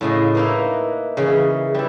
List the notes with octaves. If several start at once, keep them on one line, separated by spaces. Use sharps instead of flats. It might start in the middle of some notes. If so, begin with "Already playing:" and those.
A2 C#3 E4 D#5
A#3 D#4 E4 B4
C#3 E3 G#4
G3 E4 B4